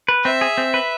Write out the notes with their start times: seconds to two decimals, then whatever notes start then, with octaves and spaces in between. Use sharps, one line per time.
0.08 B4
0.25 C4 E5
0.41 G#4
0.58 C4
0.74 B4